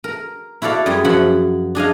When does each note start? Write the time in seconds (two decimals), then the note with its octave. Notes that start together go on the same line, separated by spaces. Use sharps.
0.04 A#4
0.62 E4 F#4 A4 D5 F5
0.86 F#2 G3 G#4 C6
1.04 F#2 F3 F#4 E5 F#5 B5
1.75 D4 G#4 D#5 F5